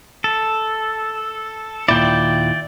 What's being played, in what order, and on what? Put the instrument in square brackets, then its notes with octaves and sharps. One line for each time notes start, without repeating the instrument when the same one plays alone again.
[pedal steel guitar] A4
[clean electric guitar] D#2 A#2 E4 [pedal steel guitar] D5 G5